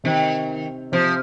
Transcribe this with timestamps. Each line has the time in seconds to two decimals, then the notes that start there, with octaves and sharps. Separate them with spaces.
0.04 C3 D#3 C4
0.92 C3 F3 C4